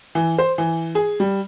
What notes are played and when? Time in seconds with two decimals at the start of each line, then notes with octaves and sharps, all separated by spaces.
0.15 E3
0.38 C5
0.58 E3
0.95 G#4
1.20 G3